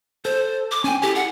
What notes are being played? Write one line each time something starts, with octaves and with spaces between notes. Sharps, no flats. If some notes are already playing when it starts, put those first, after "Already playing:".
A4 C5
D6
C#4 G5 G#5
E4 G4 A4 G#5
F#5